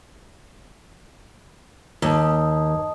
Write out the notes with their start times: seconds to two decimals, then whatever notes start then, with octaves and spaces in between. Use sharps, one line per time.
2.02 D#2 D#5 A5 D#6